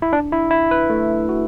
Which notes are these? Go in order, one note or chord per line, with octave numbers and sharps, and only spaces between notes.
E4
D4
E4
E4
B4
A3
F#4